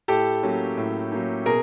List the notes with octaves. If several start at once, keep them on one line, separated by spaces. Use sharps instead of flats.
A2 G4 A4
F#3 A#3 C#4
A2
F#3 A#3 C#4
B2 G#4 A#4